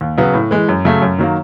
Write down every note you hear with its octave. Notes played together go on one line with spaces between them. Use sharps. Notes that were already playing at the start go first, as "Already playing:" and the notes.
D#2
C#3 F#3 B3
A2
E3 G#3
F#2
C#3 F#3 A3
F#2
D#3 F#3 A#3